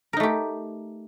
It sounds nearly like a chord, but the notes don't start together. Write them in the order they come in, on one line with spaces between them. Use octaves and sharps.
A#4 D#4 A3 G4